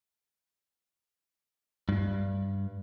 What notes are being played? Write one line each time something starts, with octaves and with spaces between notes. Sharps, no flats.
G2